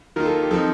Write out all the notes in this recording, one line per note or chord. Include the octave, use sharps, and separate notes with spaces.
D#3 A#3 F4 A#4
A4
G4
F3 C4 D#4 A4